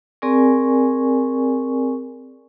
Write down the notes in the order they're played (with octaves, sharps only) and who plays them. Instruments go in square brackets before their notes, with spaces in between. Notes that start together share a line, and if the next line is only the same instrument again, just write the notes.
[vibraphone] C4 G#4 A#4 D5 G#5 C#6